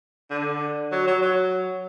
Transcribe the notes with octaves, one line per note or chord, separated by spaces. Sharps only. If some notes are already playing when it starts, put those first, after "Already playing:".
D3
F#3
F#3
F#3